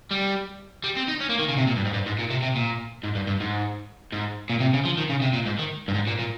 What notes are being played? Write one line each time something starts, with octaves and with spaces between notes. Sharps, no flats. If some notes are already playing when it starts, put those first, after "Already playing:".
G3
G3
C4
D#4
C#4
A#3
D#3
C#3
C3
A#2
G2
G#2
G2
G#2
A#2
C3
C3
A#2
G#2
G2
G2
G#2
G#2
A#2
C3
C#3
F3
D#3
C#3
C3
A#2
G#2
D#3
G2
G#2
A#2
A#2